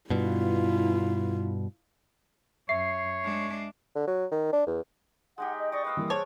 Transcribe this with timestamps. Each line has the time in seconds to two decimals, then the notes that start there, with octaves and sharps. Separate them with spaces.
0.10 G2 B2 E4 F4
2.69 F#2 C#5 E5 C7
3.24 G#3 D4
3.95 D3
4.07 F#3
4.31 D#3
4.52 D4
4.67 E2
5.38 G#3 D#4 G4 F#5
5.58 D#5
5.72 D5 D#5 C#6 D6
5.85 B4 F5 D#6 E6
5.97 E3 G3 A#3
6.10 G#4 C5 C#5 A5